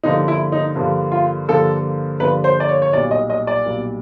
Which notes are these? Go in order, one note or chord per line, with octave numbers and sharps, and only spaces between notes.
G2 D3 F3 A#3 D#4
E4
D#4
G2 D3 F3 A#3
F4
G2 D3 F3 A#3 A4
G2 D3 F3 A#3 B4
C5
D5
C#5
C#5
B1 A#2 G3 D5
D#5
D#5
D5
B1 A#2 G3